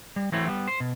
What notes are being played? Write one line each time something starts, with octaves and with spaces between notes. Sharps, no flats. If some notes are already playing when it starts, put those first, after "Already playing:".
G3
E3 F#3 A3 C4 E4 C#5
G3 B3
C5
B2